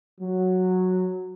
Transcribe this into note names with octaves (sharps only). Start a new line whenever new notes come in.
F#3